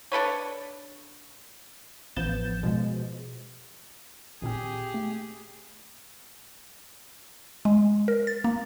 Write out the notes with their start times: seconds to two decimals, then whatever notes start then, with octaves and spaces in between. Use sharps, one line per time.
0.12 D4 A4 B4 C#5
2.16 A1 F3 B3 G6 A6 E7
2.63 B2 F3 G#3
4.42 G#1 A#2 C4 G4 G#4
4.94 A3
7.65 G#3
8.08 A#4
8.27 A6
8.44 A#3